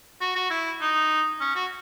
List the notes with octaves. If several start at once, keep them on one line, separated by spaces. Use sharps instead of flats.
F#4
F#4
E4
D#4
C#4
F#4